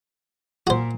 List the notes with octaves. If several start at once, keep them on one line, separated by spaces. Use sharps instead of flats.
A#2 F#4 C5